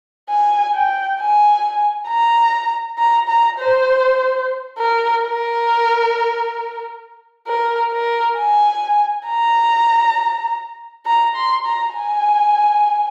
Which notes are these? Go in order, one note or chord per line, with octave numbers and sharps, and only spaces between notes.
G#5
G5
G#5
A#5
A#5
A#5
C5
A#4
A#4
A#4
A#4
G#5
A#5
A#5
C6
A#5
G#5